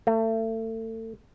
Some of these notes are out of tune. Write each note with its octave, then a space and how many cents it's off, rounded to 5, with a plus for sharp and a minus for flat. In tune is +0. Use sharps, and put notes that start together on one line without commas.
A3 +30